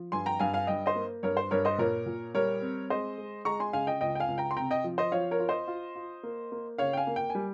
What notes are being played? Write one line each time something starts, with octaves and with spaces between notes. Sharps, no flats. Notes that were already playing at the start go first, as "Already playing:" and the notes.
Already playing: F3
G2 G#5 C6
G5 A#5
G2 F5 G#5
F5 G#5
G2 D#5 G5
C5 D#5
A#3
G2 A#4 C#5
C5
G2 A#4 C#5
C5 D#5
A#2 A#4 C#5
A#2
G3 A#4 C#5
C4
G#3 C5 D#5
G#3
G#3 A#5 C#6
G#5 C6
C#3 F5 G#5
D#5 G5
C#2 D#5 G5
G5
F5 G#5
C#2
G5 A#5
C6
C3 G5 A#5
D#5 G5
F3
C5 D#5
F3 C#5 F5
A#4 C#5
F4
C5 D#5
F4
F4
A#3
A#3
C#3 C#5 F5
G5
F5 G#5
A#3
G5
G#5
G3